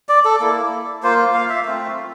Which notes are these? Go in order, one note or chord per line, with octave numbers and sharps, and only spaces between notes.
D5
A4
A#3 E4
A#3 F4 C5
F5
E5
A3 C4 F4